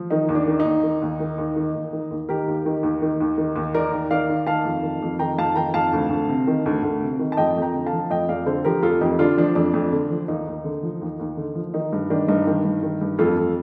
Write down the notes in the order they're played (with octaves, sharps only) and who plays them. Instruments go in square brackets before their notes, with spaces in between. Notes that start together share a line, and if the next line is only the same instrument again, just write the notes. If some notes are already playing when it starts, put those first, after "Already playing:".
Already playing: [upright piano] F3
D#3 D#4
D#2
D4
D#3
D#4
D#2
D#3
D#2
D#3
D#2
D#3
D#2
D#3
D#2
D#3 G4 A#4
D#2
D#3
D#2
D#3
D#2
D#3
D#2
D#3 A#4 D5
D#2
D#3 D5 F5
D#2
D#3 F5 A5
F2
D#3
F2
D#3 G5 A#5
F2 F5 A5
D#3 G5 A#5
F2 F5 A5
D2
D2
C3
D#3
D2
D2
C3
D#3
A5
F2 D#5 G5
F2
G5 A#5
D3
F5 A5
F3
F2 D#5 G5
F2 D5 F5
D3 A4 C5
F3 G4 A#4
F2 F4 A4
F2 D#4 G4
D3 D4 F4
F3 D4
F2 D4
F2
D3
F3
D#2 D#4
D#2
D3
F3
D#2
D#2
D3
F3
D#3 D#4
G2
D#3 D4
G2 D#4
D#3
G2
D#3
G2
F2 F4 A4
F2